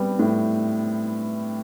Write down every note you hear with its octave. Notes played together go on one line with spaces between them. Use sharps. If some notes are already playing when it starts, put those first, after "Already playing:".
Already playing: G3 B3 C4
A2